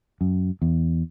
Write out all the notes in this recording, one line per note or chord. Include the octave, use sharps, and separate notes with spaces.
F#2
E2